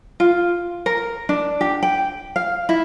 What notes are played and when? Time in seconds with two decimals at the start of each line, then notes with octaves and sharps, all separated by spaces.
0.20 F4
0.86 A#4
1.29 D4
1.61 G4
1.83 G5
2.36 F5
2.69 E4